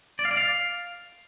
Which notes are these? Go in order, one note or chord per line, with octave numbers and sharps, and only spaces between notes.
D5
F5
D5
F5